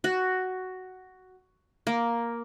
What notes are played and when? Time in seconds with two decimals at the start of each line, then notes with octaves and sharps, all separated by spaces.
0.04 F#4
1.87 A#3